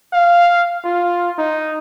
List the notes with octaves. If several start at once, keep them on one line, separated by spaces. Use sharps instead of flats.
F5
F4
D#4